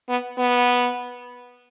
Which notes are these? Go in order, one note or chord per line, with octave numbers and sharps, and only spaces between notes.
B3
B3